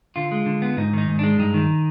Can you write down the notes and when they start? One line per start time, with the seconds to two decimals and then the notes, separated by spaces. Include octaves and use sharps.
0.16 D3 F4
0.31 G#3
0.46 D3
0.62 B3
0.77 G#2 D#4
0.93 D#3 D#4
1.08 G#2
1.19 G#3 D4
1.39 G2 D#4
1.54 D#3